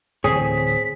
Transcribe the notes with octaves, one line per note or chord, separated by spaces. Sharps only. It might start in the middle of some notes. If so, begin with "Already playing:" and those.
D1 E3 C4 G#4 C#5 B6